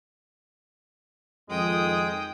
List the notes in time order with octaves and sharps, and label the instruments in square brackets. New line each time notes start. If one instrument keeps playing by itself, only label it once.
[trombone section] F2 D#3 [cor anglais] G#3 [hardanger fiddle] G5 D#6